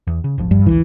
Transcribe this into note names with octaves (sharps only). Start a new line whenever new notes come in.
E2
C#3
D#1 G#1 F3
G2
D1 G#1 D2 E3